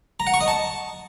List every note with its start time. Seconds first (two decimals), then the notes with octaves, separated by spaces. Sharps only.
0.20 A#5
0.27 F#5
0.34 C#6
0.41 D#5
0.48 A5